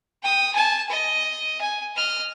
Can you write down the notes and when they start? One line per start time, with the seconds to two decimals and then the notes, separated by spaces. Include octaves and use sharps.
0.23 G5 D#6
0.54 G#5 A5
0.89 D#5
1.61 G#5
1.96 D#5 F6